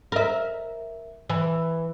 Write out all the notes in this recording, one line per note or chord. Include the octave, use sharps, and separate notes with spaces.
A#4 E5
E3